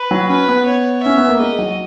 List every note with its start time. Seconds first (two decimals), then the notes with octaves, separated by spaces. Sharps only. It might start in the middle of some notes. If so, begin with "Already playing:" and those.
Already playing: B4
0.11 F#3
0.29 C#4 B4
0.48 B3
0.66 C#5
1.03 C#4 E5
1.18 B3
1.28 A#3
1.39 G#3 D#5
1.59 F#3